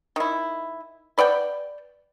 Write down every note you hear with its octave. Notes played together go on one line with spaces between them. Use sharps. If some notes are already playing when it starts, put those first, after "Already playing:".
D#3 E4
B4 D5 F#5 G5